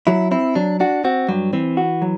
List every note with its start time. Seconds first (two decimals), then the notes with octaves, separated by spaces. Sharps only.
0.07 F#3 E4
0.31 C4 E4
0.55 F#3 D4
0.80 D4 F#4
1.05 C4 F#4
1.28 G2 F#3
1.53 E3 C4
1.77 F#4
2.02 F#3